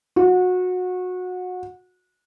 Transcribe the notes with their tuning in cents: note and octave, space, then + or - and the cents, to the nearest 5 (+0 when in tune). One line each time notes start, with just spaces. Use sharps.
F#4 -25